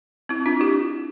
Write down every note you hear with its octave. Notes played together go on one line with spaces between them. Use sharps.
C4 E4
D4 F4
E4 G4